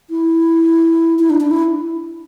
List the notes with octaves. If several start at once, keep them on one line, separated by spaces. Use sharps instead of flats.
E4
E4
D4
D4
E4